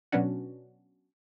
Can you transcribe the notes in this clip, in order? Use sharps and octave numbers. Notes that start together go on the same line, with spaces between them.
B2 F#3 B3 C#4 D4 F#4